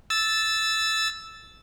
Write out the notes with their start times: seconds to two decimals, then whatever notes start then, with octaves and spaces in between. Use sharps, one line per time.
0.10 E6 A6